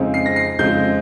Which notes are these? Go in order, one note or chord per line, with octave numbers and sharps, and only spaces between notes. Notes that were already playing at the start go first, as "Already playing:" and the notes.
Already playing: F2 C#3 G#3 C4 D#4
C7
A#6
C7
F2 C#3 G#3 C4 D#4 G6